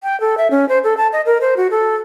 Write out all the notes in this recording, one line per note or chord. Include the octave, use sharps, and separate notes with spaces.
G5
A4
E5
C#4
C5
A4
A5
D#5
A#4
C5
F#4
A4